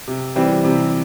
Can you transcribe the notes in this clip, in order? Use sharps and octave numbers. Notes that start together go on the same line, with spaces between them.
C3
E3 G3 C4
C3